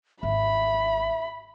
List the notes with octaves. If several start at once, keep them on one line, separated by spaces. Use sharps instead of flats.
G#1 E5 B5